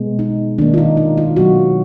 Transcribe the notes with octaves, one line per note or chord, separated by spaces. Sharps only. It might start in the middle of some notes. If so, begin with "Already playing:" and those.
Already playing: B2 G#3 B3
D#4
D#3 A#3 D4
F4
D#4
D#4
F4
B2 F#3 B3 F#4